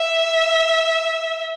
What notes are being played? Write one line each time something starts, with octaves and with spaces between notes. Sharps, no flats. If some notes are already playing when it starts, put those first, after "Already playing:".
Already playing: E5